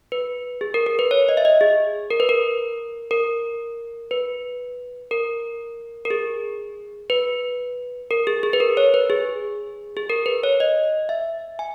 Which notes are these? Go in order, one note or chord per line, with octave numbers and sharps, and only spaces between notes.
B4
G#4
A#4
A#4
B4
C#5
D#5
E5
D#5
G#4
A#4
B4
A#4
A#4
B4
A#4
A#4
G#4
B4
A#4
G#4
G#4
B4
A#4
C#5
B4
G#4
G#4
A#4
B4
C#5
D#5
E5
G#5